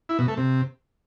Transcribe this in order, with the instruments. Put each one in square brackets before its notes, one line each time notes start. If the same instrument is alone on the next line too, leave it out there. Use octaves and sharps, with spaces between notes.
[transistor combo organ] E4
B2
A3
C3